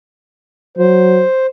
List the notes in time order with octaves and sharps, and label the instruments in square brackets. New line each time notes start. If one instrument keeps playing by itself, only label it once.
[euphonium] F#3 [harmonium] C5